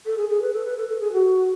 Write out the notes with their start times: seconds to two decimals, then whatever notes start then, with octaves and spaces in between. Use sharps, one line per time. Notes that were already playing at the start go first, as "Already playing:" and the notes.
0.06 A4
0.17 G#4
0.29 G#4
0.41 B4
0.53 A4
0.65 B4
0.77 A4
0.88 A4
1.00 G#4
1.12 F#4